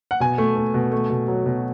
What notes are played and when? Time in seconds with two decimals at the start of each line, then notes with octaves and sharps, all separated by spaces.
0.11 F#5
0.20 B2 G#5
0.38 A3
0.56 A3
0.74 B2
0.92 A3
1.10 B2
1.28 F#3
1.46 B2